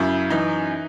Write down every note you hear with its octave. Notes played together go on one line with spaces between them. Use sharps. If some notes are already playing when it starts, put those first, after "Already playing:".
Already playing: F#2 C#3 E4
E3 D#4